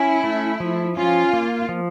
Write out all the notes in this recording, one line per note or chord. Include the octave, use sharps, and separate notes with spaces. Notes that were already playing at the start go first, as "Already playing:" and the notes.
Already playing: C#4 E4
A3
F3
C#4 F4
A#3
F3